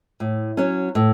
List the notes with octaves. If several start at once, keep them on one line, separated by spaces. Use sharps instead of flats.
A2
F#3 C#4
A2